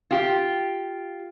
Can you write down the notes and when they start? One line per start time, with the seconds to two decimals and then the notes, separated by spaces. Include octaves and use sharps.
0.11 F4 G4